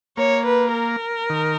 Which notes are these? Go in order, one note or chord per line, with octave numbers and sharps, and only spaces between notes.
A#3 C#5
B4
A#4
D#3